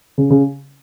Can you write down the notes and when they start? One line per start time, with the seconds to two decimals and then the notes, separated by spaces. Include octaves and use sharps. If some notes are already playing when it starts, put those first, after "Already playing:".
0.18 C#3
0.30 C#3